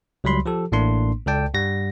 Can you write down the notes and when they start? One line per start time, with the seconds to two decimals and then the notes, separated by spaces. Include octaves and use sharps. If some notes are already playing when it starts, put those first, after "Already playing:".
0.24 C#2 F#3 G3 B5 C6
0.46 F3 G4 A4
0.72 A1 A2 A3 A#3 D4 C6
1.27 C#2 A4 D5 G5 A5
1.54 G2 G3 F#5 A#6